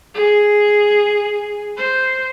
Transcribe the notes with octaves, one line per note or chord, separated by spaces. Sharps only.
G#4
C5